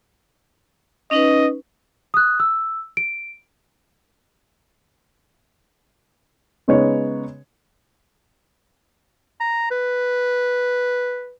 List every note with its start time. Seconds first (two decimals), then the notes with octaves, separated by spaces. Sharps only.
1.11 C#4 D#4 B4 D#5
2.14 D#6 F#6
2.40 E6
2.97 D7
6.68 C#3 G#3 B3 D#4 C#5
9.40 A#5
9.71 B4